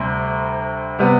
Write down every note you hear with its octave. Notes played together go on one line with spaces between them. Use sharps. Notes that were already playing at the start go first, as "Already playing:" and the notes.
Already playing: D2 C3 G3
C3 G3 B3